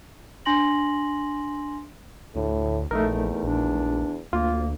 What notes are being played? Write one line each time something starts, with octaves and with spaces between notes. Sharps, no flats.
D4 G#5 C6 A#6 F#7
D2 A2
A#1 E2 A3 D#4 A#4
A#1 D4
D2 A#3 F4